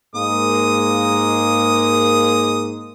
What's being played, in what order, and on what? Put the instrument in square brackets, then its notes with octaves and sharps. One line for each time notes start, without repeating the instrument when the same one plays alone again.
[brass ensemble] G#2 G#3 A#3 [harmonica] D#6